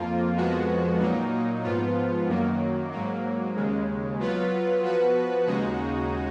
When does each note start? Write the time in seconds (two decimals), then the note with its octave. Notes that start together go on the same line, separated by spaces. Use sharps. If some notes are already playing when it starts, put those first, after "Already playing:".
Already playing: F2 F3 A#3 F4
0.36 F2 F3 G#3 B3 F#4
1.00 A#2 F#3 A#3 D#4
1.64 G#2 F3 B3 F4
2.29 F#2 D#3 F#3 A#3
2.92 G#2 F#3 A#3
3.56 D#2 C#3 G#3
4.19 F#3 B3 F4 B4
4.83 F3 B3 F#4 B4
5.47 D#2 C#3 G#3 D#4 F#4